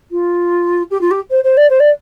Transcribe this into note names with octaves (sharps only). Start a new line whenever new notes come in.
F4
G4
F4
G4
C5
C5
D5
C5
D5